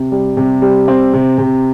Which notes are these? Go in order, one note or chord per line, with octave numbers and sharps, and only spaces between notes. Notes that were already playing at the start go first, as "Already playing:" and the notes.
Already playing: C3
G3
C3
G3
C4
C3
C3